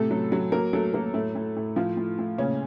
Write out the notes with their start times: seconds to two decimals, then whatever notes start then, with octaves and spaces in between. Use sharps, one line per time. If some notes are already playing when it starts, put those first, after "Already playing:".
Already playing: A2 C3 A3 A4
0.11 F#3
0.32 F#3
0.52 F#3 A#3 A#4
0.73 F#3 A3 A4
0.94 F#3 A#3 A#4
1.14 A2 A3 A4
1.35 A2
1.56 A2
1.76 A2 F3 F4
1.97 A2
2.18 A2
2.38 A#2 C#3 C#4